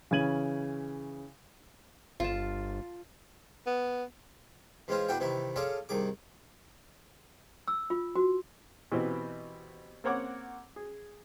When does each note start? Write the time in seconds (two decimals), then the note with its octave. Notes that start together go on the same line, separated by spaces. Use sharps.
0.11 C#3 E3 C#4 G#6 D#7 F#7
2.20 G1 F4 A5
3.67 B3
4.88 E3 G#3 C4 C#4 F4 A5
5.09 B2 D4 E4 D5 F#5 G5
5.20 C3 D#3 E3 E4
5.56 C#4 F4 G#4 A4 D5 A5
5.89 C2 D#3 G#4 D6
7.68 E6
7.90 F4
8.16 F#4
8.92 B2 E3 B3 C4 G4
10.04 A#3 C4 C#5 F#5 D6
10.76 G#4